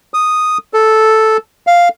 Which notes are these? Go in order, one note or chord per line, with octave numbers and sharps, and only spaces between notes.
D#6
A4
F5